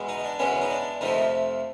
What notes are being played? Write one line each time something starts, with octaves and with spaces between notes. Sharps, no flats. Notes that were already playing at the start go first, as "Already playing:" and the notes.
Already playing: E2 B2 G#3 B3
D#4
D4
E2 B2 G#3 B3 C#4
D#4
D4
F2 C3 F3 A3 D#4